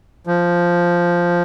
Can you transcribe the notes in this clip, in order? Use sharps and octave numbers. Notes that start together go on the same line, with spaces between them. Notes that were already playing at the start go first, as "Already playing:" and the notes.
F3